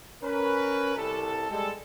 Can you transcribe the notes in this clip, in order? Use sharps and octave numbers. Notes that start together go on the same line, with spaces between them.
C#4 A#4 B4
C2 A4
G3 G#3 A4